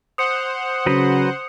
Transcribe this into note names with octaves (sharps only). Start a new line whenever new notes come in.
C5 F#5 D#6 C#7
C#3 F#3 F#4 B4